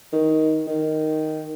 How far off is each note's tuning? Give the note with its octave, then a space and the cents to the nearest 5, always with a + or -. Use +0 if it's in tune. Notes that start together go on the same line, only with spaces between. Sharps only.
D#3 +10
D#3 +0